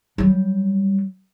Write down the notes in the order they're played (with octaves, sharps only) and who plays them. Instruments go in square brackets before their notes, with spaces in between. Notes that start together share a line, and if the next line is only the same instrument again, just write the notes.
[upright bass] F#3 G3